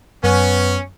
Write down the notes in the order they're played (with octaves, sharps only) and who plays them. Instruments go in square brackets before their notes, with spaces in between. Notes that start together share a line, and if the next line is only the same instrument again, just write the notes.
[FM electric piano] F#2 [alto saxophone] B3 [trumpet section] C#4